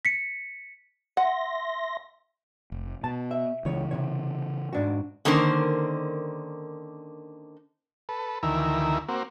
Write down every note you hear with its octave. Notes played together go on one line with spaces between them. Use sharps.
B6 C#7
E5 F#5 C6 A#6
F1
B2 A5
E5
C#2 C#3 E3 C#5
C3 C#5
G#2 D4 F#4
D3 D#3 A#3 C#4 A#4 C5
A4 B4
D2 D#3 E3 A#4 E5
A#3 C4 F#4